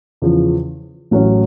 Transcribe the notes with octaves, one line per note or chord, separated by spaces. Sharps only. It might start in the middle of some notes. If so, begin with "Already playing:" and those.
E2 C#3 F3
A1 A2 F#3 A3 C#4